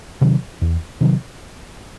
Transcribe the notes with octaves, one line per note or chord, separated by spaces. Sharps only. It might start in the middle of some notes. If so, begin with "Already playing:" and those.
C3 D#3 F#3
E2
C3 D#3 F#3